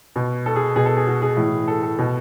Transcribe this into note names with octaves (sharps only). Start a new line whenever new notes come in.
B2
A4
G#4
B2 G#4
A4
G#4
F#4
G#4
A2 E3
A4
A4
B2